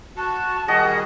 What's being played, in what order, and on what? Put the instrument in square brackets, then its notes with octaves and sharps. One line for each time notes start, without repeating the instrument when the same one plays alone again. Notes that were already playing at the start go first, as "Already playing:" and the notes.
[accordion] F#4 [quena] A5
[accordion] D#3 G3 G#4 [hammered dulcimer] F#4 D#5